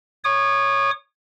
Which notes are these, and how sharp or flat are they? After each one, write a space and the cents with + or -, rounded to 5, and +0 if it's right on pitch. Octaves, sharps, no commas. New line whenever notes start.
C#5 +0 D#6 -40